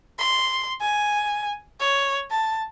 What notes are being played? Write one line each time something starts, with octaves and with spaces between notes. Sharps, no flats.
C6
G#5
C#5
A5